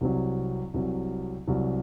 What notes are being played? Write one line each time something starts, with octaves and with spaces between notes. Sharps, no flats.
C2 C3 F#3
C2 C3 F#3
C2 C3 F#3